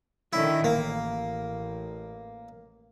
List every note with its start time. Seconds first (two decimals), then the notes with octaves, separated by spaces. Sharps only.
0.33 D3 D#3 C#4 E4
0.64 A1 A#3